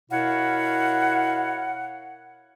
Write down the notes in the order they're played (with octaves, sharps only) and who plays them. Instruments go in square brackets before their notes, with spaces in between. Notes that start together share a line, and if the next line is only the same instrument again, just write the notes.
[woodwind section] B2 E4 A#4 C#5 F5 F#5